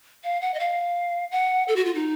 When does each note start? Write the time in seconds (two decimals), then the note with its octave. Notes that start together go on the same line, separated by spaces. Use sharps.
0.24 F5
0.41 F#5
0.54 D#5
0.60 F5
1.31 F#5
1.68 A4
1.76 F#4
1.85 F4
1.95 D#4